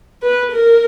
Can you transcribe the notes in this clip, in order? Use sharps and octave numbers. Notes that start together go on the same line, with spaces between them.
B4
A#4